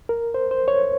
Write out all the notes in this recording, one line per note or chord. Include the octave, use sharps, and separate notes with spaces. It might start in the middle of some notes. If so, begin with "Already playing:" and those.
A#4
C5
C5
C#5